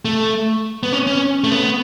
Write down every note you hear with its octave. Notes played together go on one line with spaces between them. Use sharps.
A3
B3
C#4
C#4
A3
B3